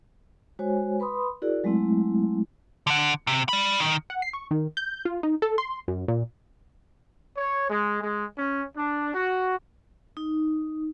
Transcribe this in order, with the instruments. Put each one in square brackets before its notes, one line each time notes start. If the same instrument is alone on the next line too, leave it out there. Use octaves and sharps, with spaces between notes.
[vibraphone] G#3 F#4 C5 C#5 G#5
B4 B5 C6 D#6
E4 F#4 G#4 A#4 D5
F#3 G#3 A3 C4 E4
[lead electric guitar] D3 F#5
C3
D5 B5
D#3
[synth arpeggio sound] F#5
C7
C#6
D#3
G6
F4
D#4
A4
C6
F#2
A#2
[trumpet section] C#5
G#3
G#3
C#4
D4
F#4
[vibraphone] D#4